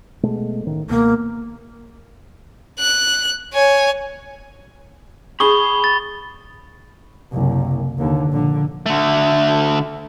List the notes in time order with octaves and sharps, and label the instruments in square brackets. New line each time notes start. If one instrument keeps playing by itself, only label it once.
[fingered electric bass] B2 G#3 A3
A1 D#3
[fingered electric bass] C#2 B2 [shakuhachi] A#3
[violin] F#6
C#5 G#5
[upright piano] G#4 [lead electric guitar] G5 B5 [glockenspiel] C#6 D#6 G7
[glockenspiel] A6
[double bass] F#1 C2
D#2 D3
A#1 D3
[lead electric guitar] D3 A3